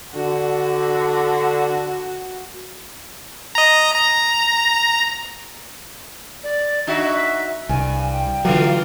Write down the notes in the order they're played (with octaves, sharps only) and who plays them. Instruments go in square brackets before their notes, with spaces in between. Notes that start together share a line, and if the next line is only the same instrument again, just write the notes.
[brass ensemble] D3 [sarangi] F#4
[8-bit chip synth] D#5 A#5
A#5
[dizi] D5
[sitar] D4 D#4 F#4 [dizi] E5
[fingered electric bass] C2 [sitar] G2 [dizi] G#5
[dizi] G5
[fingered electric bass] D3 F#3 [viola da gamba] E3 F4 [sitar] A3